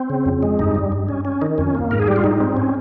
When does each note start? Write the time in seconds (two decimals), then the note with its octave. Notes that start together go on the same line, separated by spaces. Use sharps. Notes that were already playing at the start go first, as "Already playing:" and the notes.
Already playing: C4
0.10 C#3
0.26 F2
0.43 G#3
0.59 G2 D#4
0.75 G3
0.92 G2
1.09 C#4
1.25 C#4
1.41 D#3 D#4
1.58 F2 C#4
1.75 A#3
1.91 G#2 A#4
2.00 G#4
2.07 G3 G4
2.16 F4
2.24 G#2 D#4
2.40 C4
2.57 C#4